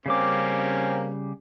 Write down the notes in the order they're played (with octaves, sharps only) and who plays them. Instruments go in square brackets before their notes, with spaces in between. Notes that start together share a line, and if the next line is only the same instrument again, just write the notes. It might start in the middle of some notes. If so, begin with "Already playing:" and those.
[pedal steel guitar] C#3 G3 D6 [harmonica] A#3 C4 C#4